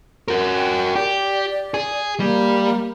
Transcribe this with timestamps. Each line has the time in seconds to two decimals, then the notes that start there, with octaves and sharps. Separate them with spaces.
0.28 F#4 A#4
0.55 G5
0.95 G4 D5
1.74 G#4
2.20 G3 A#3